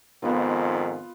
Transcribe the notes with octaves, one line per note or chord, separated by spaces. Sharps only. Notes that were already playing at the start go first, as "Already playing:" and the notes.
F2 G#2 D#3 B3 F4